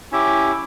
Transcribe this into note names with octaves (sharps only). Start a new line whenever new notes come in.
C#4 E4 G4